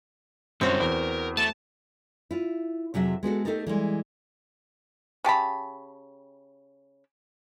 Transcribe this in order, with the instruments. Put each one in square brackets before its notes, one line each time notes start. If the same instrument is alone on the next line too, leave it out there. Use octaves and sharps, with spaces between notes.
[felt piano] F#2 C#5 [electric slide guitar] D3 G3 F4 [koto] C4 F#4
[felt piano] E2 [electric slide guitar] A#4
[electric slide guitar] A3 [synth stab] A5
[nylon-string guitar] E4 F4
F2 C3 F#3 G#4 E5
G#3 B3 F#4 A4
A3 D#4 G4 A4 A#4
E3 G3 G#3
[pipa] C#3 G4 A5 B5